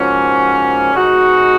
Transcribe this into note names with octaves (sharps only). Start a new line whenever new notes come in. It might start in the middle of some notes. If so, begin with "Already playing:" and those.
Already playing: G#2 F3 A#3 C#4 F#4
B2 G#3 D#4 F#4